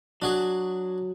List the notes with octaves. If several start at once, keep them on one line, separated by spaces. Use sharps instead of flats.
F#3 D4 F#4 G#4